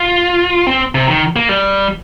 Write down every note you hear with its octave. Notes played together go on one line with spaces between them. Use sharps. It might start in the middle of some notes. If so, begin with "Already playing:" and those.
Already playing: F4
C4
C3
D#3
A#3
G3